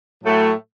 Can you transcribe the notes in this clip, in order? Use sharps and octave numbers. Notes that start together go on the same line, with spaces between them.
A2 F#3 A3